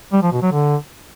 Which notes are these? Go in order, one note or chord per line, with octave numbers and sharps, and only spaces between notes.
G3
F3
B2
F#3
D3